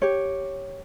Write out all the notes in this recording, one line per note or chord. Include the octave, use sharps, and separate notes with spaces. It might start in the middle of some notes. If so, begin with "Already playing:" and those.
G4 C#5